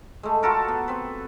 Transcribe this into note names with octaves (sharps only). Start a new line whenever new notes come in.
G#3 A3
F4 F#4 A4 A#4
B3
C4 B4